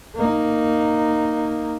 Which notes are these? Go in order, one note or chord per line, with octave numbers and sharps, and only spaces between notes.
A#3 D#4